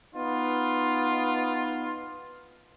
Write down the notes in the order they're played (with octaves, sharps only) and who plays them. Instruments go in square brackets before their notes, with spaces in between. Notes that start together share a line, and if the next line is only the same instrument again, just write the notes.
[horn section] B3 D#4 F4